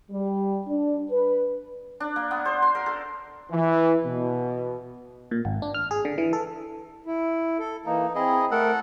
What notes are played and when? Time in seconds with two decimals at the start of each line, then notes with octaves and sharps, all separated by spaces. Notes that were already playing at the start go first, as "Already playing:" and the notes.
0.11 G3
0.67 D4
1.11 B4
2.00 D4
2.16 A#3
2.31 B3
2.45 C5
2.62 C6
2.75 A#4
2.86 A4
3.51 E3
4.04 B2
5.31 A#2
5.45 G#1
5.62 D4
5.74 F6
5.91 G#4
6.05 D3
6.18 E3
6.33 A4
7.06 E4
7.59 A4
7.86 E3 A#3 D#4
8.15 C4 E4 G#4 D#5
8.51 A3 A4 A#4 F#5